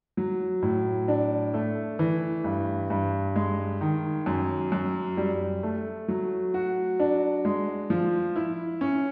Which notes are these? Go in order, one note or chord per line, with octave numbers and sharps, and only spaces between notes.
F#3
A2
D4
A3
E3
G2
G2
G#3
D#3
F#2
F#2
G3
A3
F#3
F#4
D4
G#3
F3
E4
C#4